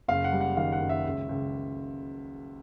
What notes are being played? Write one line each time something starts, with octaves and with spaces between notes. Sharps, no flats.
F#1 F5
F#5
G3
F#5
D#3 F5
F#5
F#2
E5
C#2
C#2